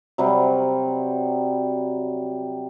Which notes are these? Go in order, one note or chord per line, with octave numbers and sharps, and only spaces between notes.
C3 F#3 G3